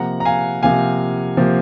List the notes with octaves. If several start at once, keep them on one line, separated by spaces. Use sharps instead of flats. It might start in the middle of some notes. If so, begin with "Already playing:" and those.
Already playing: C3 F3 A#3 F#5 A#5
A#5
F5 G#5
C3 F3 A#3 F5 G#5
C3 F3 A#3